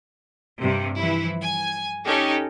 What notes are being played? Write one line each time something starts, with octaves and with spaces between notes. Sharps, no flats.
G2 C3
E3 F3 E4
G#5
C#4 D#4 G4 A4